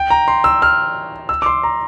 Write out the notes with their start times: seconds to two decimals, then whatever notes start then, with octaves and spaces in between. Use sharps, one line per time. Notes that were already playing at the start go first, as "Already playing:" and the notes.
Already playing: G5
0.10 A#5
0.28 C6
0.44 E6
0.62 F6
1.29 E6
1.42 D6
1.46 C6
1.64 A#5